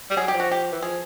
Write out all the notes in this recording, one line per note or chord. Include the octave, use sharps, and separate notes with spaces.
G3
F#3 G#4
G4
F3
F#4
G4
E3
F3 G#4